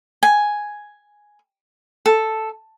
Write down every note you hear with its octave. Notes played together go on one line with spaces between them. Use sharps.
G#5
A4